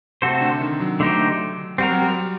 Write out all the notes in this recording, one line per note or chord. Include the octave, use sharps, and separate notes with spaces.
C3 A3 C4 F#4 A4 C5
D3
D#3
F#3
D3 A3 D#4 G4 C5
G3 C4 F#4 A#4
F#3
G3